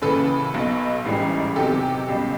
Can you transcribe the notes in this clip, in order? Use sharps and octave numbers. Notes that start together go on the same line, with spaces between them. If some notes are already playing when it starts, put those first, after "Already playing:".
D#2 C#3 E3 A4 B4
B1 B2 F#3
A1 G#2 E3 G3
E2 C3 D#3 F#3 G4 A4
C#2 B2 G3